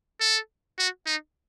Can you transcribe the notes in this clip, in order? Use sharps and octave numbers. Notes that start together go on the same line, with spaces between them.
A4
F#4
D#4